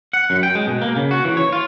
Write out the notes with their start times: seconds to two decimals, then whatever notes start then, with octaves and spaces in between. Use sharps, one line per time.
0.13 F#5
0.30 F#2
0.43 G5
0.55 G#3
0.67 B2
0.82 A#3
0.96 C#3
1.11 F#4
1.24 E3
1.37 C#5
1.53 F4